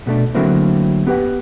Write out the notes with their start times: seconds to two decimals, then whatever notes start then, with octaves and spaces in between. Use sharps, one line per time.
0.07 B2 A3 D4
0.35 D3 F#3 A3 A#3 C4 E4
1.07 B3 G4 B4 F#5